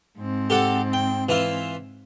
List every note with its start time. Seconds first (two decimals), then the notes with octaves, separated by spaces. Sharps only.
0.19 G#2 C4
0.50 G4 A4 F#5
0.93 G5
1.29 E3 E4 F4